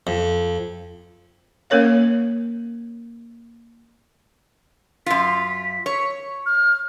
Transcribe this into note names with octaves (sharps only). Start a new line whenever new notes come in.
F2
A#3 C#4 A#4 C#5 F5
F#2 F4 B6
C#5
F6